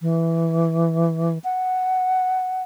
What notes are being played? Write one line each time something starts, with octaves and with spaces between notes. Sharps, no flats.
E3
F#5